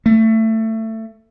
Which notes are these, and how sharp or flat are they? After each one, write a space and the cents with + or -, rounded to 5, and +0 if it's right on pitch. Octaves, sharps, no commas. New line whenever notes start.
A3 +20